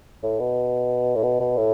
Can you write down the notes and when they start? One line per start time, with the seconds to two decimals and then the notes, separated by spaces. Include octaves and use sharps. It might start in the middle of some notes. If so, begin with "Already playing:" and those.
0.23 A2
0.39 B2
1.15 A2
1.23 B2
1.40 B2
1.57 A2